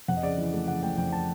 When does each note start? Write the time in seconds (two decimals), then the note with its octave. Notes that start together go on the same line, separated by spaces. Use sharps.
0.08 F2 F#5
0.17 D#5
0.23 C#3 D5
0.38 E3
0.53 A3
0.68 C#3 F#5
0.83 A3 G5
0.98 F2 G5
1.12 A5